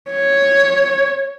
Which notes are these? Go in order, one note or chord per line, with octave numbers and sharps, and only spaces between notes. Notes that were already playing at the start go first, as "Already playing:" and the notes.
C#5